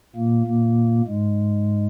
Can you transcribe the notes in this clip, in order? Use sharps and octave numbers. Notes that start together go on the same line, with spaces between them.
A#2 A#3
A#2 A#3
G#2 G#3